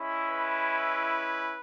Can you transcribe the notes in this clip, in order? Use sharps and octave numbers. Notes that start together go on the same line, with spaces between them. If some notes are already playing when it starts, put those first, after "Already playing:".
Already playing: G#3 C#4 E4
B4